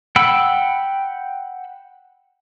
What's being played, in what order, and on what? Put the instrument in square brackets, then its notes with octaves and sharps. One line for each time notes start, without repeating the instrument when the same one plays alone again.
[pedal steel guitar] F#5 G5 B5 E6